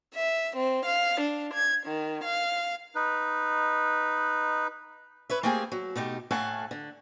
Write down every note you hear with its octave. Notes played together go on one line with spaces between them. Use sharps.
E5
C4
F5
D4
G#6
D#3
F5
D#4 B4
B4 C#5 E5
A3 A#3 C4 G4 G#4 G#5
F#3
B2 A3 D#4 G4
A2 A3 A4 F5 F#5 G#5
D3